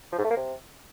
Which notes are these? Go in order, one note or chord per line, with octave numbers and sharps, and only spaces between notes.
F3
G#2
A3
A#3
C3